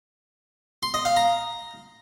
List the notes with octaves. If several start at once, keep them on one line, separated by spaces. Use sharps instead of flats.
C6
D#5
F5
A#5